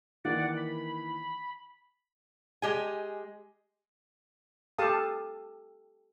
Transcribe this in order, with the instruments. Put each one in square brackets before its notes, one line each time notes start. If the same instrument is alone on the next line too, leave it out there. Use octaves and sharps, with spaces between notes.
[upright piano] D#3 E3 A#3 [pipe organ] D5 F#5
[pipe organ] B5
[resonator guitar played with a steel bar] G#3 G4 G#5
[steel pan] G4 A4 F5 A5 D#6